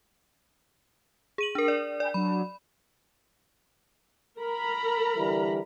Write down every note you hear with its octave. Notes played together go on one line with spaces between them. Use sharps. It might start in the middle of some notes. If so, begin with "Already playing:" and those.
G#4 D#7 F#7
D4 A#4
D5
D5 G5 G#5 B5
F#3 D4 B5
A#4 A#5 B5
D3 E3 G3